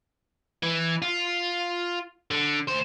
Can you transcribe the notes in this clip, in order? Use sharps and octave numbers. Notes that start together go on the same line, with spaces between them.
E3
F4
D3
D2 C5